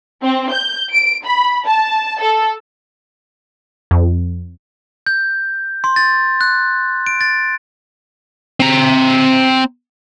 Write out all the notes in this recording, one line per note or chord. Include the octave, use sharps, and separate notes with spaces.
C4
G6
D7
B5
A5
A4
F2
G6
C6
A6
F#6
D7
A6
C4 A#5